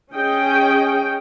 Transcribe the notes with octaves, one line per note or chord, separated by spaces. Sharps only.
C#4 G#4 D#5 G5